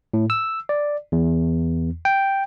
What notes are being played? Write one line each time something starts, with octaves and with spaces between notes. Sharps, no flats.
A2
E6
D5
E2
G5